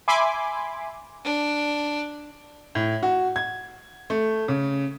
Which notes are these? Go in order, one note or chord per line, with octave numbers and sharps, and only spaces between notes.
E5 G#5 B5 C6 D6
D4
A2
F#4
G#6
A3
C#3